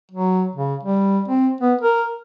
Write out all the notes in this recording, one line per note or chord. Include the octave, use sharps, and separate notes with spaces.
F#3
C#3
G3
C4
B3
A#4